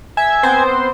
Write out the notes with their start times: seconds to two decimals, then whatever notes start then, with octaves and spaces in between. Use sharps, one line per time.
0.17 E5 G#5
0.43 B3 C4 C5